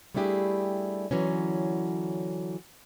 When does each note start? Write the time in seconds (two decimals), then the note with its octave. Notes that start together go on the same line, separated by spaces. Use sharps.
0.14 G3 A3 D4 E4 G4 G#4
1.11 D3 E3 F#3 C#4